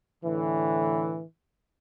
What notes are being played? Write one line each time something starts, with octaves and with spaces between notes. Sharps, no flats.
A2 D3 E3